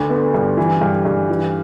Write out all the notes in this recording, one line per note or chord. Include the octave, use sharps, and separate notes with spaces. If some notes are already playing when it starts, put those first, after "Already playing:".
Already playing: D2 D3
B3
G2
E3
G2
G2
E3